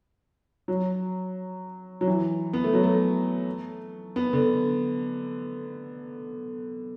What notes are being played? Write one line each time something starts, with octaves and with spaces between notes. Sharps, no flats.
F#3
F#3
E3
B3
A3
F#3
A3
B3
D3